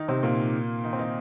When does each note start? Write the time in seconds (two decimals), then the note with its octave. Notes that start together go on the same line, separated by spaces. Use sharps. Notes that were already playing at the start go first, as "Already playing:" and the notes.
Already playing: D#3 D#4
0.08 C3 C4
0.23 A#2 A#3
0.84 D#3 D#4
0.93 C4
0.99 D#3 D#4